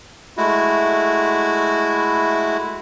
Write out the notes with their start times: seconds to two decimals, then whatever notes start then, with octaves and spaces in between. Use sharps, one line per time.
0.37 G#3 A3 E4 F#4